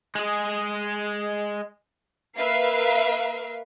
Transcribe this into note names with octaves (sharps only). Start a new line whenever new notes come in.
G#3 G#4
A#3 A#4 B4 E5 F5 C7